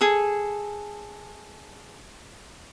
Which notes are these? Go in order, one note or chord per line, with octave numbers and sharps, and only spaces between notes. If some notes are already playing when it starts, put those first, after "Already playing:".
G#4 A4